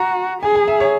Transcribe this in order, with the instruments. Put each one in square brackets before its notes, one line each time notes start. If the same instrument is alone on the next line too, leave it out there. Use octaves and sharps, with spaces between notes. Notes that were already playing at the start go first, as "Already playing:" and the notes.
Already playing: [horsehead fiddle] F#4 [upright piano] A#5
[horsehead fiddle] G#4 [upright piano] G#5
[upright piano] G#5
E5
C#5